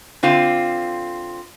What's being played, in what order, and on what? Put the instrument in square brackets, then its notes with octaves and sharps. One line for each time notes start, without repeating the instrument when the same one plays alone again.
[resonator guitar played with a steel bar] D3 C4 F4